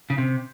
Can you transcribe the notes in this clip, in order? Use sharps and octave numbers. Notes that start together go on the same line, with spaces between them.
C#3
C3